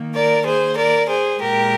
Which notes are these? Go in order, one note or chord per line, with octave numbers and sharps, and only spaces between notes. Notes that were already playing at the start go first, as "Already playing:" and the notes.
Already playing: D#3 A#3
A#4 D5
G#4 C5
A#4 D5
G#4 C5
A#2 G#3 G4 A#4